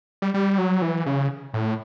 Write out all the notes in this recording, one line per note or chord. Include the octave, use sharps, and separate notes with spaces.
G3
G3
F#3
E3
C#3
A2